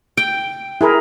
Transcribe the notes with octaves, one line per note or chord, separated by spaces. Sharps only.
G5
E4 G#4 A#4